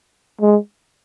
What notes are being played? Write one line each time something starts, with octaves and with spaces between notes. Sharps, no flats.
G#3